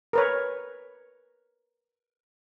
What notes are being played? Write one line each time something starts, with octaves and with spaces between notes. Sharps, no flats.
A#4 B4 C#5